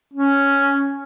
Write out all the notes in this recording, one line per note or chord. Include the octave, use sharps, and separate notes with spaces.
C#4